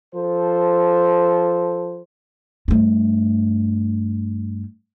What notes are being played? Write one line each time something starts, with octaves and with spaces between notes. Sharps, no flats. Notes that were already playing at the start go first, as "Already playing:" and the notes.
F3 A4 C5
G2 A3